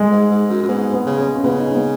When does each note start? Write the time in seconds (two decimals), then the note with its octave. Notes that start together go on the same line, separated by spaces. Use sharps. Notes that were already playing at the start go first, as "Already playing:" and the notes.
Already playing: G#3
0.12 G#2
0.31 G#2
0.50 F#2
0.63 F#2
0.68 G#2 B3
0.93 B3
1.06 C#3
1.19 C#4
1.35 C#4
1.44 C#3 B3
1.60 D#4
1.67 C#4
1.74 B3